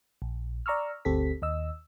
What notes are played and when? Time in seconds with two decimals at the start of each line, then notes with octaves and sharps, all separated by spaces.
0.22 A#1
0.66 D5 A#5 C#6 E6 F6
1.05 G1 D2 C4 G4 A4 B6
1.42 D#2 D#5 E6